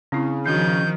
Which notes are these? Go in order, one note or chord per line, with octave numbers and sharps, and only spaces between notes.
C#3 C4 E4
D#3 F3 D4 F#4 G6